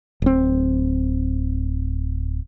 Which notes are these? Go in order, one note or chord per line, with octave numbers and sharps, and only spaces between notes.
D1 C4